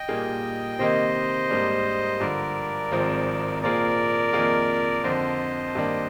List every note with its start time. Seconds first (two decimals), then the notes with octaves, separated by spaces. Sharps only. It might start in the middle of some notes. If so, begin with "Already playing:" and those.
Already playing: D#5 G5
0.08 A#2 G3 A#3 D#4 G#4
0.79 C3 D#3 A#3 D#4 C5 D#5
1.50 G#2 G3 A#3 D4
2.20 G2 D3 F3 A#4 D5
2.92 G#1 G#2 F3 C4
3.62 A#2 F3 C4 F4 G#4 A#4 D5
4.33 F2 D#3 A#3 F4 G#4
5.04 F2 D3 F3 C5 D#5
5.75 G2 D#3 A#3 D4